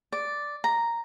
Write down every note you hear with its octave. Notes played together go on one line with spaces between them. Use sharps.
D5
A#5